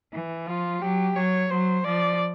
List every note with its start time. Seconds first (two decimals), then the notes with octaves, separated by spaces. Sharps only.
0.12 E3
0.46 F3 F4
0.81 F#3 G4
1.15 F#3 C#5
1.49 F#3 C5
1.84 F3 D5